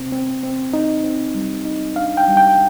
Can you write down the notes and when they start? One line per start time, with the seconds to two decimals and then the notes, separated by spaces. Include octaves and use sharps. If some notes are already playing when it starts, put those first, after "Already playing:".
Already playing: C3 C4
0.12 C4
0.43 C4
0.73 D#4
1.04 C4
1.35 G3
1.65 D#4
1.96 D4 F5
2.17 G5
2.28 G3
2.37 G5